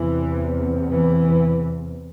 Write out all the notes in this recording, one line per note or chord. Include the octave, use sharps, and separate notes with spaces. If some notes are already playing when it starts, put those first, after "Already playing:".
Already playing: E2 C3 E3
E3